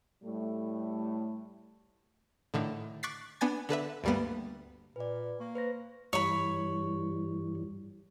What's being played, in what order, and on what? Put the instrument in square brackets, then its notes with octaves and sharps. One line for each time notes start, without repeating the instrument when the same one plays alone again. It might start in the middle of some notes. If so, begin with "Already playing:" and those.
[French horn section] A2 G3 A3
[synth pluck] A2 D3 D#3
C#6 D6 F#6 A6 B6 C7
B3 D4 G#5 G#6 A6
D3 A4 B4 E5
D2 G2 G3 A#3 B3
[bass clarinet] A#2 [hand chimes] B4 D5
[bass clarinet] A#3 [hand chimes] C#6
[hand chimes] B4 C5 A#6
[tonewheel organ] G2 E3 G3 [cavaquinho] C#5 B5